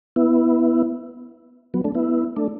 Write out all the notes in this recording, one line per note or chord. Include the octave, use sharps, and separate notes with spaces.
B3 E4
F#3 B3
A3 D4
B3 E4
A3 D4